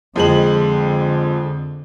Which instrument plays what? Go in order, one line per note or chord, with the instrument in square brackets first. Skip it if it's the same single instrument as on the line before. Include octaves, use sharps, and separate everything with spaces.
[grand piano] F2 G#3 F#7 [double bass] D3